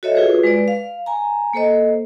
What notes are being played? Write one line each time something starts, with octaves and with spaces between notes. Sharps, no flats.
F#4 A4 C#5 D#5 E5
F4 F#4 G#4 B4 C5
G#3 B4 D5
F5
G#5 A#5
A#3 A4 C5 D#5